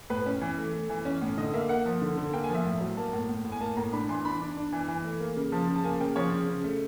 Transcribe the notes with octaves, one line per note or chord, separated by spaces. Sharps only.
A2 B4
C#4
E3
A3
A3
E3
C#4
A2
D3 D#5
A#3 E5
A#3 F#5
F3
D3
D3
A#3 G5
G#5
F3
E5
A2
F#3
A#3 A5
A2
A2
A2
G#5
A#3 A5
A2 A#5
D4 B5
E3 C6
D4 B5
D4
D4
E3
E3
A3
A#3
C#3
F3 A5
C#3
A5
A#3 G#5
C#3 G5
F3 C#5
C#3
C#3
A3